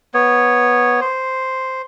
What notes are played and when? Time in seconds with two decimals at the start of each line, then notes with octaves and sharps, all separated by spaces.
0.14 B3 C#5
1.01 C5